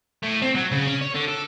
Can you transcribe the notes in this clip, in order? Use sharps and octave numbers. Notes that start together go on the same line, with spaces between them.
A2
C4
F#3
C#3
C#4
C#5
D3
A4